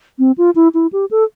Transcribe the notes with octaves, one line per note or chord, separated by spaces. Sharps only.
C4
F4
E4
E4
G4
A4